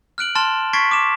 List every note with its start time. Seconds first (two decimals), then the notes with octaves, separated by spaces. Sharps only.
0.18 F6 F#6 D7 F#7
0.35 A5 C6 F6 A6 E7
0.73 C#6 G#6 A6 B6 C7 D7
0.91 D6 E7